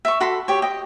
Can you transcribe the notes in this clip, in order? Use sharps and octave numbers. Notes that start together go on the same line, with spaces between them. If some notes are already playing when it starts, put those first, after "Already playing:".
E5 C#6
F#4 A4 B5 C6
G4 C#5
D#5 G5